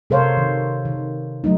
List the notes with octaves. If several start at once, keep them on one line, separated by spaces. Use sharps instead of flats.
C3 A4 A#4 C5 C#5 F5
D#3
D#3
F#3 A3 D#4